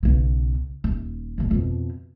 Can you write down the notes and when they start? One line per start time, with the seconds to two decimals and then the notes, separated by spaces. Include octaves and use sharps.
0.03 B1 C#3
0.84 D#1
1.38 D#2 A#2
1.51 F2 B2